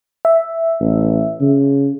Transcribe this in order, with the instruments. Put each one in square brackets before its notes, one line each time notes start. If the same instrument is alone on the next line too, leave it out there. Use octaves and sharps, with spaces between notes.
[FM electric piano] E5
[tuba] A1
C#3